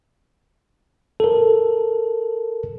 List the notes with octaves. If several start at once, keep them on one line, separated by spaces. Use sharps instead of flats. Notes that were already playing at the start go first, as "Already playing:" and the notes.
A4 A#4